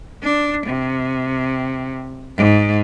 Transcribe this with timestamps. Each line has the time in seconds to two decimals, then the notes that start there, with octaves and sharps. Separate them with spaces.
0.24 D4
0.67 C3
2.37 G#2